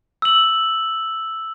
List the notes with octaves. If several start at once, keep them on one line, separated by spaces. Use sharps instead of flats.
E6 F#7